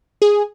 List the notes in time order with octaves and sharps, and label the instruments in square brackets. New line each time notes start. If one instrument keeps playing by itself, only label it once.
[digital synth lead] G#4